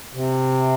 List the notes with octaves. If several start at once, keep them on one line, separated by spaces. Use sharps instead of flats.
C3